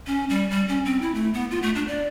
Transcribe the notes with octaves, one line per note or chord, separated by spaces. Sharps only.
C#4
G3
G3
C#4
C4
E4
A3
B3
F4
A3
D4
D5